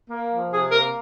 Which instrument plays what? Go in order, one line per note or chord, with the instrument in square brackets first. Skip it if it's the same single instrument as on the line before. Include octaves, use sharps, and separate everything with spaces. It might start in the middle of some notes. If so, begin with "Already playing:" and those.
[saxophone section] A#3
F3
C3 G#4
A#3 A#4